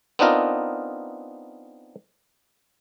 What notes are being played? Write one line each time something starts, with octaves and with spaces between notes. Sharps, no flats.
B3 C4 D4 D#4 F4 A#4